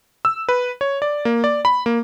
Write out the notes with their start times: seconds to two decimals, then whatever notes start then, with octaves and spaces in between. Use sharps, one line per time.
0.25 E6
0.49 B4
0.81 C#5
1.02 D5
1.25 A#3
1.44 D5
1.65 B5
1.86 A#3